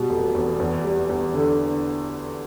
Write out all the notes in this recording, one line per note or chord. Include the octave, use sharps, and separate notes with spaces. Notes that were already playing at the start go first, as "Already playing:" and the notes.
Already playing: B2 G3
F1
E2
E2
G3
E2
D3